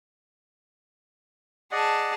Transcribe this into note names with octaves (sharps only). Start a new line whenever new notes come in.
G#4 D5 D#5 F#5 A5